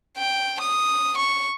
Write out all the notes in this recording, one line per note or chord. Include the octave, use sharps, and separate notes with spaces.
G5
D#6
C#6